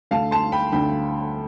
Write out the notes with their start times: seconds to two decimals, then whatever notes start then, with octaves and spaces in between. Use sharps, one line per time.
0.11 D2 D3 A3 F5 A5
0.31 A5 C6
0.52 G5 B5
0.72 D2 D3 A3 G5 B5